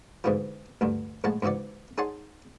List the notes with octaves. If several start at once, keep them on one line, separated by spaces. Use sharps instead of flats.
G#2 B2 D3 E3 F3
D2 G2 D3
A#1 A2 G#3 F#5 A5
G#2 C#3 E3 F#4 D5
D#4 G#4 C#5 F#5 A5 C6